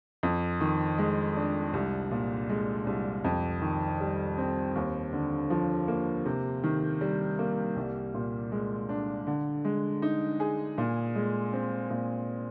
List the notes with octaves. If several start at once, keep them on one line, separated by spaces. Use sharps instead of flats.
F2
D#3
G#3
D4
C2
A#2
G#3
C2
F2
D#3
G3
C4
D#2
D3
F3
A#3
C3
D#3
G3
A#3
C2
A#2
G#3
D4
D3
G#3
D#4
G#4
A#2
G#3
C4
A#2